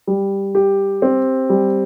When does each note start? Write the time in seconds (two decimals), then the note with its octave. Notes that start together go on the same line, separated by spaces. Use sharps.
0.07 G3
0.55 G4
1.02 C4
1.50 G3